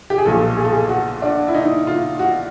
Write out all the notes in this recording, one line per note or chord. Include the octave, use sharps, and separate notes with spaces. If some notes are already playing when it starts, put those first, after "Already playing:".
G4
G#4
B1 A#2 F3 A4
G#4
A4
G#4
F#4
D4
E4
D#4
F4
F#4